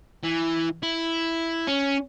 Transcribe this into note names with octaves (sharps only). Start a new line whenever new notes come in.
E3
E4
C#4